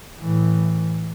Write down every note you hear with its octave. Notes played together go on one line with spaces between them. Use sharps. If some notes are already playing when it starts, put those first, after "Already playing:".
A2 E3